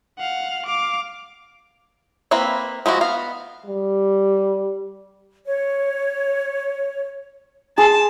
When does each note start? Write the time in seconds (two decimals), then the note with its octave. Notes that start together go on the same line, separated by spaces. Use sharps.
0.19 F5 F#5
0.66 F5 D6
2.31 A#3 C4 E4 B4 E5
2.86 F3 G#3 E4 F#4
3.01 B3 F5
3.66 G3
5.46 C#5
7.78 G#4 A5 C6